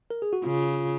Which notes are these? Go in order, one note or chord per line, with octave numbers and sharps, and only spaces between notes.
A#4
G#4
F#4
C#3 F4